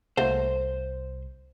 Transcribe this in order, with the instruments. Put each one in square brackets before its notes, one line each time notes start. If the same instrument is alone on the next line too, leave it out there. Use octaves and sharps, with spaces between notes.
[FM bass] C2 [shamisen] A3 A#3 F#4 [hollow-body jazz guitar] C5